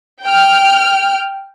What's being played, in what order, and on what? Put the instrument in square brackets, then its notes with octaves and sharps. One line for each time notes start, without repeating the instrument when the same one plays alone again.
[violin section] G5 F6